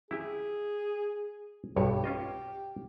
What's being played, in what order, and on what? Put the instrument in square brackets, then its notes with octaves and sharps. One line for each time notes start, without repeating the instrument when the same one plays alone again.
[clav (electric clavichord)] E4 G4 E5 [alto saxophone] G#4
[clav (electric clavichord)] B1 G2 C#5 [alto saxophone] G4
[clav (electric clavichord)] C#4 F4 D#5